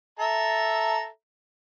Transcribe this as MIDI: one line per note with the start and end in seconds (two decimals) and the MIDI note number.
0.19 1.07 69
0.19 1.07 76
0.19 1.07 82